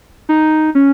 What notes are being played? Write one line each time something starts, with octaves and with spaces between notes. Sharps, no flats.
D#4
C#4